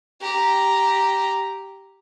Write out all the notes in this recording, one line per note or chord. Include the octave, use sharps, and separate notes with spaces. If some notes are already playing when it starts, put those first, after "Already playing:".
G4 A#5